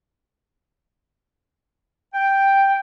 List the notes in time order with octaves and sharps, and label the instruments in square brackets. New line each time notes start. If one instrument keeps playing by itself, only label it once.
[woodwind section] G5